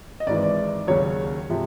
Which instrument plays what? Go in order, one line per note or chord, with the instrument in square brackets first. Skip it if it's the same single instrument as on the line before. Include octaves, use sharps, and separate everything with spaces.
[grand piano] D#5
G#1 G#2 E3 D5
D5
D#2 C#3 F#3 C#5
C3 F3 G#3